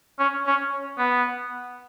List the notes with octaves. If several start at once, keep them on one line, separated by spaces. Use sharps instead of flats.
C#4
C#4
B3